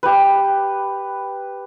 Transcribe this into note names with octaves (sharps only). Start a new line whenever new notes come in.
G4 B4